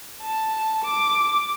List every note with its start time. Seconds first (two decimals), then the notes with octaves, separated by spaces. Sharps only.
0.23 A5
0.84 D6